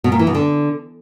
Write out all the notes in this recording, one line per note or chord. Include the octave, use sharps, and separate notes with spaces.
B2
A#2
E3
B2
D3